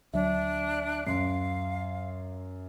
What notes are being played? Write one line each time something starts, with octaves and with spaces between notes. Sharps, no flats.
D2 F#3 D4 E5
F#2 F5 C6 C7